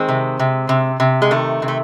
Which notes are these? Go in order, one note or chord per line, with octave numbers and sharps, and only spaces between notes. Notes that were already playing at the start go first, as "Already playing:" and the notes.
Already playing: D#3 G#3 C4
C3
C3
C3
C3
G#3
D#3 A3
C3
A3